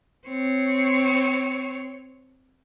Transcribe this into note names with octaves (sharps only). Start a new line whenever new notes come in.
C4 C#5